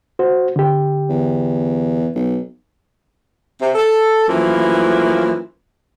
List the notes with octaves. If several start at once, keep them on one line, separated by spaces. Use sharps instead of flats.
F#4 C5
D3 G4
E2
B1
C3
A4
F#2 E3 F3 A3 A#3 E4